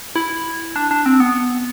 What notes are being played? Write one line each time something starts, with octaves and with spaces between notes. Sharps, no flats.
E4
D4
D4
C4
B3